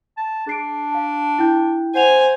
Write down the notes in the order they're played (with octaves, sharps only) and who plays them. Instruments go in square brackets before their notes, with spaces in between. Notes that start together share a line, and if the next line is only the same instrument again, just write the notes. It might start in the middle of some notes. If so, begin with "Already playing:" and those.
[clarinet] A5
[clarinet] D4 [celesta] G#4 C7 D7
[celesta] F5 A5
E4 G5 G6
[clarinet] C5 [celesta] F#5 F7 [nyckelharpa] G#5